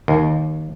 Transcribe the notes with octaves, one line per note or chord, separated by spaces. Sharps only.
D#2